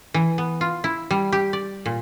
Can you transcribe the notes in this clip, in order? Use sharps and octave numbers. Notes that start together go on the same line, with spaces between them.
E3
B3
F4
E4
G3
G4
D5
A#2